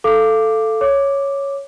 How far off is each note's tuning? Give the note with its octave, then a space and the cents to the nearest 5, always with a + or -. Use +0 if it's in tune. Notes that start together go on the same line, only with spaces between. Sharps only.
A4 +0 F5 -15 D6 +5
C#5 +0 D6 +0